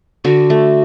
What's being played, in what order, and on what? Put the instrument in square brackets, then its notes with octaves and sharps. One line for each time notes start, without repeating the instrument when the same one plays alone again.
[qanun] D3 [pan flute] F#4
[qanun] A3